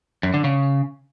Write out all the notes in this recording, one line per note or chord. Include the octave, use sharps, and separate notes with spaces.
F#2
D3
C#3